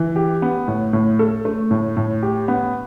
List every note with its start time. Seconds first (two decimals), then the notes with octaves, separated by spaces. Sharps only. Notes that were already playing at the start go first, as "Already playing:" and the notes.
Already playing: E3
0.16 G4
0.42 B3
0.68 A2
0.93 A2
1.19 A4
1.45 A3
1.71 A2
1.97 A2
2.23 G4
2.48 B3